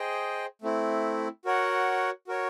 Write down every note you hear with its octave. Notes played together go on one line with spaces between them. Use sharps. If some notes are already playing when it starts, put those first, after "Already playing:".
Already playing: G#4 C5 D#5 G5
A3 C4 E4
F#4 A#4 C#5 F#5
F#4 A#4 C#5